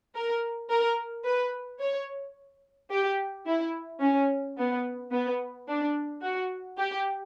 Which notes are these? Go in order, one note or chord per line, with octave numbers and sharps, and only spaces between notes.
A#4
A#4
B4
C#5
G4
E4
C#4
B3
B3
D4
F#4
G4